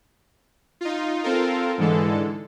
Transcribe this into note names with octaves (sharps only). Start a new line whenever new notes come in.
D#4 F4
C4 F4 A4 A#4
G#2 D3 E3 G#3 A4